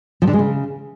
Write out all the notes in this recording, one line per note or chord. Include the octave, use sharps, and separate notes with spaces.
F3
D3
G#3
C#3